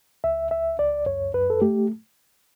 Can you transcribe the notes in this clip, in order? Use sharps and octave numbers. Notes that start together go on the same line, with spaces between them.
C#2 E5
C#2 E5
C#2 D5
F#2 C#5
F#2 B4
A4
A3 G4